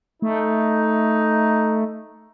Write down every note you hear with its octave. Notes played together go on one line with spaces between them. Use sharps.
A3 D#4